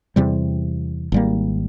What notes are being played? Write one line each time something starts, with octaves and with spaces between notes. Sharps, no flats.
E2 C3 G3
G#1 G3 A#3